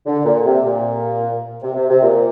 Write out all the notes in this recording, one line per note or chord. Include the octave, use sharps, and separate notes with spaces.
D3
A#2
C3
A#2
C3
C3
C3
A#2